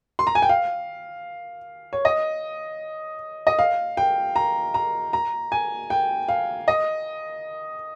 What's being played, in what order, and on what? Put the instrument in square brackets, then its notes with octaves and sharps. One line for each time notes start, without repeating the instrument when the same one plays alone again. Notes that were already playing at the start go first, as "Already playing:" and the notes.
[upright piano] C6
A#5
G#5
G5
F5
C#5
D#5
D#5
F5
G5
A#5
A#5
A#5
G#5
G5
F5
D#5